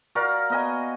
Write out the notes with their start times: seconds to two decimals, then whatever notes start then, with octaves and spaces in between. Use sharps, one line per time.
0.15 F#4 A#4 D5 F5
0.50 B3 D#5 G#5